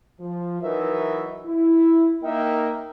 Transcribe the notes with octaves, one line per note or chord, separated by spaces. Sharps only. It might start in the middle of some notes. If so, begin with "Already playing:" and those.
F3
E3 F#3 D#4 A#4 B4 E5
E4
A#3 D#4 A#4 D#5 E5 G5